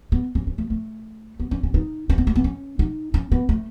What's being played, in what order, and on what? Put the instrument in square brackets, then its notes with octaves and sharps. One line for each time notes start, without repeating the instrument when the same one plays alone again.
[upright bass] B3
C#4
C#4
A3
A3
B3
C#4
C#4
D#4
C#4
B3
A3
B3
C#4
D#4
C#4
B3
A3